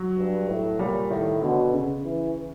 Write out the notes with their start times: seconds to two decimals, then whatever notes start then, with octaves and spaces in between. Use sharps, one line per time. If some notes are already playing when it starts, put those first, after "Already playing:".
Already playing: F#3
0.17 G2
0.48 A2
0.79 A#2 G3
1.10 A2 D#3
1.41 B2 D3
1.73 C#3
2.04 E3